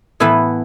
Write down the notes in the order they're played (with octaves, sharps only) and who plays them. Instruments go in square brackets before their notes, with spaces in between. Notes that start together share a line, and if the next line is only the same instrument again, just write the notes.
[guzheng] A2 E3 B3 E4